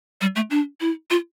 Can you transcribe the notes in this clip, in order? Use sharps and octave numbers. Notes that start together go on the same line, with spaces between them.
G3
A3
D4
E4
F4